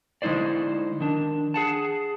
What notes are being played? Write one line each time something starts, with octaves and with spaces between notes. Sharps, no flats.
D3 G#3 D#4 E4 C5 D5
D#3 D4
G#4 F#5 A5